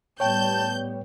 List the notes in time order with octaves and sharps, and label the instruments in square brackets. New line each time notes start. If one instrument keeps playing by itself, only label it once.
[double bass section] A2 G3 B3 [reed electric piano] C#5 G5 [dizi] A5 [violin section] G6